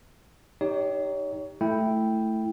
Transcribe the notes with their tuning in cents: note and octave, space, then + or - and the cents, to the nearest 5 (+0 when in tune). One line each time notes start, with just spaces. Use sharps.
D#4 +0 G4 +0 C#5 +30
A3 +0 E4 +0 G5 +0